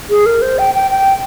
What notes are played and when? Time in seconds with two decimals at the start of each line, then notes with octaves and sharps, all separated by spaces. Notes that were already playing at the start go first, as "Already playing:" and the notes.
0.10 G#4
0.26 A#4
0.42 C5
0.59 G5
0.75 G5
0.91 G5